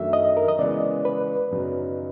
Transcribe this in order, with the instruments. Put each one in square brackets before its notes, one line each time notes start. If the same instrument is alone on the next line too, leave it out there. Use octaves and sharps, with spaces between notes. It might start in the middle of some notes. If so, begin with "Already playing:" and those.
Already playing: [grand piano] F#2 D#3 F#3 A3 D4 [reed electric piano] E5
[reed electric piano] D#5
A#4
D#5
[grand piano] C#3 E3 G#3 B3 [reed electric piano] D5
[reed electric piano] B4
[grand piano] F#2 C#3 F#3 B3 D#4